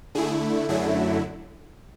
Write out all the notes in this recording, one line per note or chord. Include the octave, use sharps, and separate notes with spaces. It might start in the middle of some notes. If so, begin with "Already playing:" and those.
D3 A3 E4 G#4
F#2 D3 F#3 A3 E4 G#4